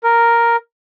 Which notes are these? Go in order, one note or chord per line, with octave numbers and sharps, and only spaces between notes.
A#4